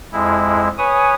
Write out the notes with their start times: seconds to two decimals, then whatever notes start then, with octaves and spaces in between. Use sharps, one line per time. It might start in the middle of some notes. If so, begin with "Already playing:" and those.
0.13 F2 G#3 E4
0.78 B4 C#5 G#5 D#6